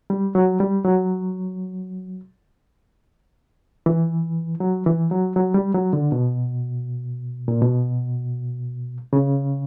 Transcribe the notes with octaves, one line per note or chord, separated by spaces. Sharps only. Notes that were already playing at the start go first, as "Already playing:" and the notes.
G3
F#3
G3
F#3
E3
F#3
E3
F#3
F#3
G3
F#3
D3
B2
A#2
B2
C#3